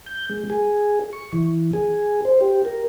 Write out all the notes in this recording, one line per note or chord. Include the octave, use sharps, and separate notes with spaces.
G6
G#3
G#4
C#6
E3
G#4
C5
G4
A#4